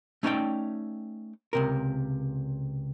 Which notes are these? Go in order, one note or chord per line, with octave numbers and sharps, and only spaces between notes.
A3 C#4 D#4 C5 D5 G5
C#2 C3 A#4